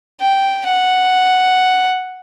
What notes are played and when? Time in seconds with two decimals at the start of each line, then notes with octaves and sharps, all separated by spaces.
0.20 G5
0.66 F#5